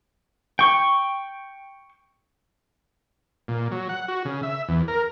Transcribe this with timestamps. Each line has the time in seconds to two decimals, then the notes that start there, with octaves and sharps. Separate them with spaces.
0.59 G5 C#6
3.48 A#2
3.72 F#3
3.89 F#5
4.08 F#4
4.25 C#3
4.43 E5
4.69 E2
4.88 A#4